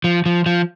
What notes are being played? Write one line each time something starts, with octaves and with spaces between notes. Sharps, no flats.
F3
F3
F3